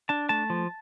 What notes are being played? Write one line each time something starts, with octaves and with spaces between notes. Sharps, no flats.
D4 A5
A3 A5
F3